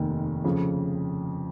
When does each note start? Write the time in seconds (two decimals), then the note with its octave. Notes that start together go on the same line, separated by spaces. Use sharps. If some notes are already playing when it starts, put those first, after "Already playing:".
Already playing: F1 D#2 D#3
0.44 F2 C#3 F3